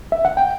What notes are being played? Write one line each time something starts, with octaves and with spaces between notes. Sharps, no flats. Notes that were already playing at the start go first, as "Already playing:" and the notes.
E5
F#5
G5